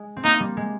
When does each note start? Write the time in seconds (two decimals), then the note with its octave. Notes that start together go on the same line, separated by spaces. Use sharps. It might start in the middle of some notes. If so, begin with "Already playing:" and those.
Already playing: G#3
0.17 C4
0.24 A#3 D#4
0.40 G3
0.57 G#3